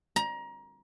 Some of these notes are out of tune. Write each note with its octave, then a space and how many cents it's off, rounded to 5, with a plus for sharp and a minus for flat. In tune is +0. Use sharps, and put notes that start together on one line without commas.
A#5 +25